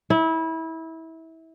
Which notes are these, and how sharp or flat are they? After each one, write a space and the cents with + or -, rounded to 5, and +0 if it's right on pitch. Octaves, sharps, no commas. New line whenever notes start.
E4 -25